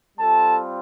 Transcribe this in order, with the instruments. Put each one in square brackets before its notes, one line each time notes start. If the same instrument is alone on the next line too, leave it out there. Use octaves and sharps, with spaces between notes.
[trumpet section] G3 C4 F4 A4 A5